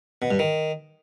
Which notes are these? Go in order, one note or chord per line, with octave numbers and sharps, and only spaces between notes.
B2
G2
D#3